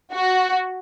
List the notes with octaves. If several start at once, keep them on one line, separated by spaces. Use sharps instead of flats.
F#4